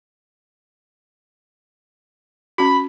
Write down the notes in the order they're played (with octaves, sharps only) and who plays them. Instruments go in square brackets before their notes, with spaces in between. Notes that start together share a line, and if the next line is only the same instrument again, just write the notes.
[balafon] C#4 F#4 [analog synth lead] B5